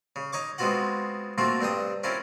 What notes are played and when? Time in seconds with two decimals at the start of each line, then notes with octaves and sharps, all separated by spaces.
0.16 C#3
0.33 D#4 C#5 C#6 D6
0.58 G#3 B3 C4 F4 F#4 F#5
1.38 A3 A#3 C4 F4 F#4
1.61 G2 C4 G5 D#6
2.04 C4 C#4 E4 F4 A#4